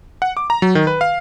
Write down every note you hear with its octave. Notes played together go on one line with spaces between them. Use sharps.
F#5
D6
A#5
F#3
D#3
B4
F5